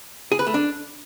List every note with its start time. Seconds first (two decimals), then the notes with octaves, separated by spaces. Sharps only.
0.32 G#4
0.39 B4
0.47 A3
0.54 D4